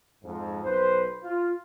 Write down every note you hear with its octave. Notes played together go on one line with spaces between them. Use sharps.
F2 G#2
B1 B4 C5
F4